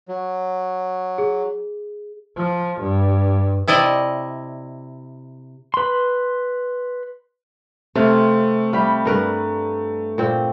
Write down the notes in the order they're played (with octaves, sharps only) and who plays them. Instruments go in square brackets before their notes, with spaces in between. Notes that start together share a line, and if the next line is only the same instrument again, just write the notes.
[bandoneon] F#3
[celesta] G#4
[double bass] F3
G2
[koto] C3 E4 D5 D#5
[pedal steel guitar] B4 C6
[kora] C3 [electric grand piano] A3 [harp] C4 F5
[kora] G3 [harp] F5 G5 B5
[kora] G2 A#4 B4
A#2 C4